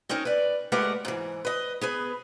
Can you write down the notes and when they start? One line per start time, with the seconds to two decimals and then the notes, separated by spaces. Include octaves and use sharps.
0.09 C4 C#4 D#4 A#4
0.25 B4 D5
0.72 G#3 A3 G4 A#4 B4 F#5
1.05 G#2 E3
1.45 B4 D#5
1.81 B3 G#4 B4